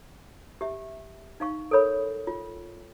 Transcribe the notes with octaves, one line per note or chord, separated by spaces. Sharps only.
G4 E5
D#4 F5 C#6
A4 A#4 C#5 B5
F4